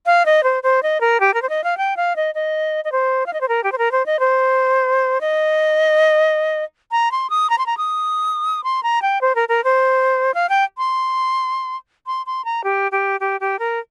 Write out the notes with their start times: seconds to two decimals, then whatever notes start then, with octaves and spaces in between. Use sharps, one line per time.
0.06 F5
0.26 D#5
0.43 C5
0.63 C5
0.83 D#5
1.01 A#4
1.20 G4
1.34 A#4
1.42 C5
1.49 D#5
1.64 F5
1.77 G5
1.96 F5
2.16 D#5
2.35 D#5
2.84 D#5
2.92 C5
3.26 F5
3.33 D#5
3.41 C5
3.48 A#4
3.64 G4
3.72 C5
3.78 A#4
3.92 C5
4.06 D#5
4.20 C5
5.21 D#5
6.91 A#5
7.12 C6
7.30 D#6
7.50 A#5
7.58 C6
7.66 A#5
7.77 D#6
8.64 C6
8.83 A#5
9.02 G5
9.21 C5
9.35 A#4
9.49 A#4
9.64 C5
10.34 F5
10.49 G5
10.78 C6
12.06 C6
12.26 C6
12.45 A#5
12.64 G4
12.92 G4
13.20 G4
13.40 G4
13.59 A#4